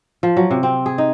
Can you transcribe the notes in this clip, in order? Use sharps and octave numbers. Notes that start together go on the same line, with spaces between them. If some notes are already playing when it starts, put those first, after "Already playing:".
F3
F#3
C3
C4
G#4
D#4